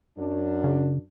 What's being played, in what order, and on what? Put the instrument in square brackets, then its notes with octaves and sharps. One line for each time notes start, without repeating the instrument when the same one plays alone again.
[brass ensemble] F#2 D4
[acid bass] C#3